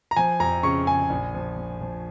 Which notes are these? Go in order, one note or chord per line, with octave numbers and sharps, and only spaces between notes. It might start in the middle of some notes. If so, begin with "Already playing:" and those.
A#5
F3 G#5
F2 A#5
C#3 C#6
C#3 G#5
A#1
F3
F3
F3